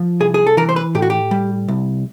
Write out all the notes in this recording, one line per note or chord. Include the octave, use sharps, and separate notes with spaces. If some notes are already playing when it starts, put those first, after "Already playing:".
Already playing: F3
C2 G#4
G#4
A4
E3 A#4
C5
B4
A2 G4
F#4
G4
G3
C2